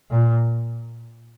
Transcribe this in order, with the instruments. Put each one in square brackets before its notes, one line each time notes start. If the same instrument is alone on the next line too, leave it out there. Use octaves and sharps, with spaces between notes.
[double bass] A#2